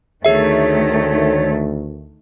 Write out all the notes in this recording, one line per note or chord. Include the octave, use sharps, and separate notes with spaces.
D2 D#3 A3 G#4 C#5 E5